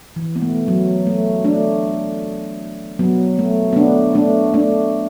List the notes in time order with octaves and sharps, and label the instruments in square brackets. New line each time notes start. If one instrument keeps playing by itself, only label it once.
[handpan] E3
B3
A3
F#3
A3
A3 D4
F#3 B3
A3
B3
A3 D4
A3 D4
A3 D4